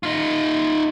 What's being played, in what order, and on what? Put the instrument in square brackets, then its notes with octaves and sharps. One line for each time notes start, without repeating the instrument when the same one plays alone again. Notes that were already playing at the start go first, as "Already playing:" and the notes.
[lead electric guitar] D#4 F4